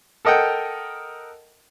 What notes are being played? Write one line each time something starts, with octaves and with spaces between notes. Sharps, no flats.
A4 A#4 D#5 F#5 G5